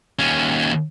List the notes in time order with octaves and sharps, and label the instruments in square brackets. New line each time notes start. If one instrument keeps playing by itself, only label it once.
[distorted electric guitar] D#2 C#4